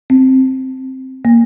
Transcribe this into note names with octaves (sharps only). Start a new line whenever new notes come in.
C4
A#3